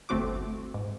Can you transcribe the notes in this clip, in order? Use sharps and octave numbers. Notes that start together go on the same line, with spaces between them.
G1 D2 A3 C4 F#4 D6
G#2